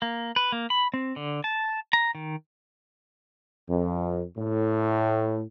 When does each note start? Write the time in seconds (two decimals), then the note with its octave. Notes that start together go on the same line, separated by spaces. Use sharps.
0.02 A#3
0.36 B4
0.52 A#3
0.70 B5
0.94 C4
1.16 D3
1.44 A5
1.93 A#5
2.15 D#3
3.68 F2
4.37 A2